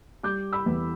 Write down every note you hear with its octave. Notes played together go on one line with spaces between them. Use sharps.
G3 D6 G6
B5 E6
E2